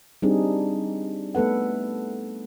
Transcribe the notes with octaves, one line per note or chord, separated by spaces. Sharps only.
G3 C4 D4 D#4 G#4
A3 B3 A4 B4 F#5